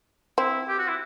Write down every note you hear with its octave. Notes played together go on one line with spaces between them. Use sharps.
C4 E4
G4
F#4
E4